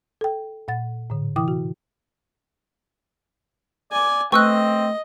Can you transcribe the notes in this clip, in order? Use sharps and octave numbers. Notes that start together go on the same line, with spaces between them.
A4 G5
A#2 F#5 A6
A2 D3
C3 E3 E4 G5 D6 D#6
F#4
D5 G#5
A3 C4 B4 D#5 G5 C#6 E6 F#6